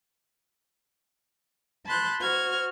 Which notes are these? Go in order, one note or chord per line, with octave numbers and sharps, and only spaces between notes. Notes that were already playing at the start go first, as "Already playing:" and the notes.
A5 B5 C6 F#6 G6
F#4 C5 F6 G#6